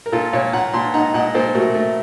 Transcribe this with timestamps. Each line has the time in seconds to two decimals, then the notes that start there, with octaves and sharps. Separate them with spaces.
0.06 A#4
0.12 A#2 F4 A4
0.33 A#2 C#5 F5
0.53 A#2 F#5 A#5
0.74 A#2 A5 C6
0.94 D#4 F#5 A#5
1.14 A#2 D#5 F#5
1.34 A#2 A4 C5
1.55 A3 F#4 A#4
1.75 A3